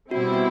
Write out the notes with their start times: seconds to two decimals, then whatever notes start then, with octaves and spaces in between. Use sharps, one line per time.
0.11 B2 G3 C4 E4 F#4
0.34 F#4